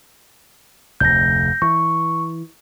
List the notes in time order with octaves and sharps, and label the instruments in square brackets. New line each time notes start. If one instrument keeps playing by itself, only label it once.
[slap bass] F1 D2 [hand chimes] G6 A#6
[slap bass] E3 [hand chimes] C#6